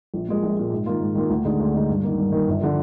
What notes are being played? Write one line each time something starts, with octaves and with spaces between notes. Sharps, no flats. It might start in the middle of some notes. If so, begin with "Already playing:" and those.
A#1
A#2 G#3
A#1
A#2 G#3
G#2
D#3 A#3 F4
G#2
D#3 A#3 F4
D2
D3 G#3 D#4
D2
D3 G#3 D#4
G2
D#3 A#3
G2
D#3 A#3
G1
D3 F3